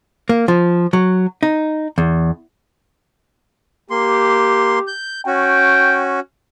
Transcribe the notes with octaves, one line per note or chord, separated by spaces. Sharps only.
A#3
F3
F#3
D#4
E2
A#3 G4 C6
G6
C#4 F#4 G5